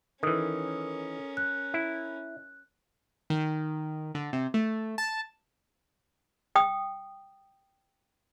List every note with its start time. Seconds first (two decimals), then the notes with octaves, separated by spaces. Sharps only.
0.23 D#3 E3 C#4 A4 A#4 D#6
1.37 F#6
1.74 E4
3.30 D#3
4.15 D3
4.33 C3
4.54 A3
4.98 A5
6.55 G5 D#6